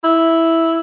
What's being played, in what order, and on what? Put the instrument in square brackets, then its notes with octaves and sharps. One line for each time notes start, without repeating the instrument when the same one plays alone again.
[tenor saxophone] E4